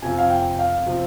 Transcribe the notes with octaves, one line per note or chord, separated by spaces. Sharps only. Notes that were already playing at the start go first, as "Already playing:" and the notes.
F2 C3 F3 C4 G#5
F5
G5
F5
C3 F3 C4